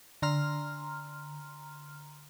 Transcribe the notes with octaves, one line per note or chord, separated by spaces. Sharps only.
D3 A#5 C6 F6